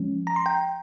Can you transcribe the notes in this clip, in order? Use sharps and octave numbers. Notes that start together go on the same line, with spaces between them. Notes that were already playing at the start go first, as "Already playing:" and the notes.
Already playing: F3 G#3 C#4
A#5
C6
G5 A#5